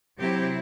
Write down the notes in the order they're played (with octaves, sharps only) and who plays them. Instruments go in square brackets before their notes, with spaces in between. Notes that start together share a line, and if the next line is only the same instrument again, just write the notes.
[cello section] C3 F#3 C4 E4 G4